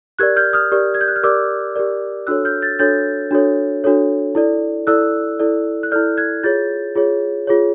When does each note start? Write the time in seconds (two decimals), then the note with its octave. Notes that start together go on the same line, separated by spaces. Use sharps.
0.19 G4 A#4 D5 F#6 G#6
0.36 F6 G6
0.53 D#6 F6
0.72 G4 A#4 D5
0.94 G#6
1.01 G6
1.08 F#6
1.16 F6
1.23 G4 A#4 D5 D6 E6
1.75 G4 A#4 D5
2.27 D4 F#4 A4 C#5 E6 F#6
2.44 F6 G6
2.62 G6 A6
2.79 D4 F#4 A4 C#5 G6 A6
3.31 D4 F#4 A4 C#5
3.84 D4 F#4 A4 C#5
4.35 E4 A4 D5
4.87 E4 A4 D5 E6 F#6
5.40 E4 A4 D5
5.83 F#6
5.91 E4 A4 D5 F6 G6
6.18 F#6 G#6
6.43 F4 G#4 C#5 G6 A6
6.96 F4 G#4 C#5
7.47 F4 G#4 C#5